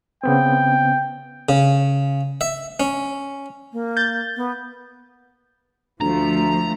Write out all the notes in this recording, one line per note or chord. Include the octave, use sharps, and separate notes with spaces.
C#3 B3 C4 G5
C#3
E5
C#4
A#3
G6 A6
B3
D2 F3 A3 A#5